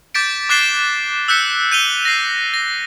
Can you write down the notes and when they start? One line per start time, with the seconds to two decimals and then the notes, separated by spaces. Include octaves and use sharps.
0.14 D6 G6 A6 B6 D7
0.49 D6 F#6 A6 C7 E7 G7
1.28 E6 F#6 G6 B6 C#7
1.71 G6 D#7 F7 G7
2.05 A#6 C7
2.54 A#6